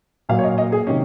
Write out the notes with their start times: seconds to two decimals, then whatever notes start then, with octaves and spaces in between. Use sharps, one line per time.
0.29 A#2 F#3 A#3 F5
0.39 C#5
0.44 D#5
0.58 D#5
0.72 G#4
0.87 C3 D#3 F#3 C#4